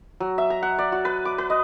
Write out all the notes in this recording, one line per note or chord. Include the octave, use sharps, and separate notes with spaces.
F#3
E5
A#5
F#5
D5
F#4
B4
D6
B4
D#5